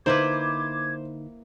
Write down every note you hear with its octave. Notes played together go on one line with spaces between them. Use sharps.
D3 A#3 D#4 E4 B4 C5 D6 G#6